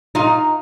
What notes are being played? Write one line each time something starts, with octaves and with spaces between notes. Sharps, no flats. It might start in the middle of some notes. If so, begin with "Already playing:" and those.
D#4 F4